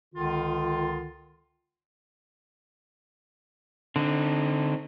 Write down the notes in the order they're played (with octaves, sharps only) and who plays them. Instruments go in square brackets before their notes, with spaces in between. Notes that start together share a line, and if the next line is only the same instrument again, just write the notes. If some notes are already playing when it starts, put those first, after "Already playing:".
[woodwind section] C#2 D3 D#3 F4
[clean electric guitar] D3 [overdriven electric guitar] C4 D#4